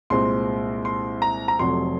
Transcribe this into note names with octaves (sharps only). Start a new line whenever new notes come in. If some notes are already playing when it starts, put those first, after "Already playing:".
C2 A#2 G#3 C4 C6
C6
A#5
A#5
F1 F2 C3 F#3 C6